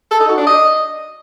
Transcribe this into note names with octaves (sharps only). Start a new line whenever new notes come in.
A4
D#4
F#4
D4
D#5